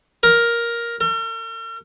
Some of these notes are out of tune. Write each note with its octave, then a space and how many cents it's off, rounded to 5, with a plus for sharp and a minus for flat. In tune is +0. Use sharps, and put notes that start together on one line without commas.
A#4 +10
A#4 -45